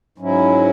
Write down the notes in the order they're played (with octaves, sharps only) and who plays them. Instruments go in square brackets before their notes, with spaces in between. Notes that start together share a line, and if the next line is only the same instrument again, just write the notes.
[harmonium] G#2 F#3 C#4 E4